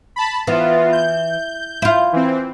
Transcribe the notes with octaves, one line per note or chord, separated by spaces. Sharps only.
A5 B5
E3 B3 F4
G6
E4 F4
E3 C4